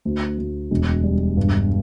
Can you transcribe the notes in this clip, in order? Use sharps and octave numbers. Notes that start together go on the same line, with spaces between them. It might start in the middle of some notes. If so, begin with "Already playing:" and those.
D2
D2
E1
G3
G2